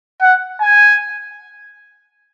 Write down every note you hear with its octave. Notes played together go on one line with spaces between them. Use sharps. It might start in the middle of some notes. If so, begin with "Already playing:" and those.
F#5
G#5